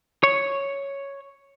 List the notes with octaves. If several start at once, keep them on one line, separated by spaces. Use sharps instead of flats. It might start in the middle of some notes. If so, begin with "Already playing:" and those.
C#5